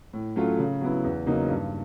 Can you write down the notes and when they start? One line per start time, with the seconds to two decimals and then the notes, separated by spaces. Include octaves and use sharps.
0.13 A2
0.36 F#3 A3 C#4 F4
0.59 C#3
0.81 F#3 B3 E4
1.04 E2
1.26 C#3 F#3 A#3 D#4
1.49 G2